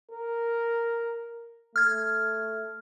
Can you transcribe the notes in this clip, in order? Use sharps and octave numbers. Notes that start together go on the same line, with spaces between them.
A#4
A3 F6 G#6